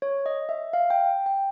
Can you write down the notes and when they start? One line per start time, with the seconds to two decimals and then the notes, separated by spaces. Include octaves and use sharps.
0.02 C#5
0.26 D#5
0.49 E5
0.73 F5
0.90 G5
1.26 G5